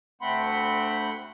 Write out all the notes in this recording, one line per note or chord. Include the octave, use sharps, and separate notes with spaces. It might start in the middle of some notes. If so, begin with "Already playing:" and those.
D2 A3 C4 F#5 B5 C6